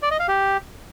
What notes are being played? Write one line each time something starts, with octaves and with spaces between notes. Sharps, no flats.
D5
D#5
F5
G4